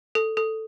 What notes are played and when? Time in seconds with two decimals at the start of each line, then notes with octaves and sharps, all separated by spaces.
0.15 A4
0.37 A4